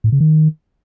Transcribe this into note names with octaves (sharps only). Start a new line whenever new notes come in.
A2
C#3
D#3